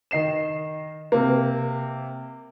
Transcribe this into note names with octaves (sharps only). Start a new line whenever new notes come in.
D#3 D#5 C7 E7
C3 A#3